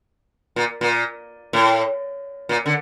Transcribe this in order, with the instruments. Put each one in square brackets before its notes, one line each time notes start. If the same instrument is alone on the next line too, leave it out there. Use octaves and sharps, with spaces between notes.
[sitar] A#2
A#2
A2
A#2
D3